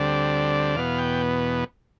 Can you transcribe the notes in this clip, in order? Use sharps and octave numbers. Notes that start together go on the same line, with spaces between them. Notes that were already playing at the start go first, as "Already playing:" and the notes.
Already playing: D2 D3 G3 C4 D5
E2 B2 B3 F5
G5